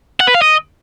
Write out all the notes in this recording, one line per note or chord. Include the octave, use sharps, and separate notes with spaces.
F#5
B4
F5
D#5